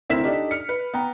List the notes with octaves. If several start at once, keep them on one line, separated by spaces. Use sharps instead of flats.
D2 C4 E4 A#4 B6 E7
D4 D#4 G4 A4 D5
F6 C#7
B4
B3 G5 A#5